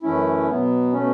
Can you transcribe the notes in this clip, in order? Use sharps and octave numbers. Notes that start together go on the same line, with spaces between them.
F#2 E3 A3 C#4 E4
B2 F#3 B3
B2 A3 C#4